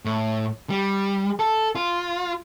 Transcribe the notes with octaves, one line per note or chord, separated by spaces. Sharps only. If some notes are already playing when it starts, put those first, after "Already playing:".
A2
G3
A4
F4